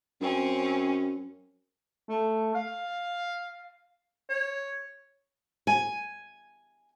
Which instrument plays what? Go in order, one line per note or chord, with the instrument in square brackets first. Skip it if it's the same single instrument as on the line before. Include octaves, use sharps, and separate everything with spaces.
[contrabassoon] F#2 [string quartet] C4 C#4
[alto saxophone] A3
F5
C#5
[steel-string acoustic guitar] G#5